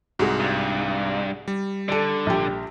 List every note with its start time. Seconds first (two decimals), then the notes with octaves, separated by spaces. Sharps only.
0.19 C2 G#2 F#4 G#4
0.40 G2
1.48 G3
1.89 D3 A4 D5
2.26 A#1 G4